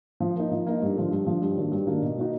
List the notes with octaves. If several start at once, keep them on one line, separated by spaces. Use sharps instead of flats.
F3
A#3 D#4
F3
A#3 D#4
G2
D3 F3
G2
D3 F3
G2
D#3 F#3 A#3 D4
G2
D#3 F#3 A#3 D4
B2
F#3 A#3 D#4 F#4